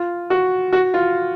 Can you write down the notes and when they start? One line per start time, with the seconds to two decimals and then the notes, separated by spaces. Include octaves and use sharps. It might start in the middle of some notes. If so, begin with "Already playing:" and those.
Already playing: F4
0.30 F#4
0.73 F#4
0.94 F4